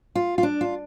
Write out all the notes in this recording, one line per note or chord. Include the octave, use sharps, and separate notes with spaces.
F4
F4
D4
F4